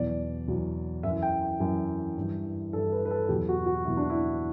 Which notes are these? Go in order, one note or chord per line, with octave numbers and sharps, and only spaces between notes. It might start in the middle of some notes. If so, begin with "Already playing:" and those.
Already playing: E2 B2 F#3 D5
E2 B2 F#3
F#2 E5
E3
G5
F#2 E3
G2 E3
G2 E3 A4
B4
B4
A4
E2 B2 F#3 G4
F#4
F#4
E2 B2 F#3 E4
D4
E4